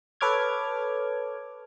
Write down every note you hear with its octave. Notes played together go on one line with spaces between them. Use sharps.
A4 B4 C#5 D6 F6 G#6